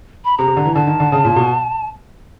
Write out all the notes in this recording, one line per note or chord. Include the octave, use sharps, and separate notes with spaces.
B5
C3 A#5
C3
D3
E3
D3 A5
D#3
D3
C#3
A#2
B2